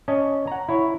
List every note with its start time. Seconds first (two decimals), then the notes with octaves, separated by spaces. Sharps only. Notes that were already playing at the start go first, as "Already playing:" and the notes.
0.08 C#4 D#5 A5
0.47 F#5 A#5
0.69 E4 C#5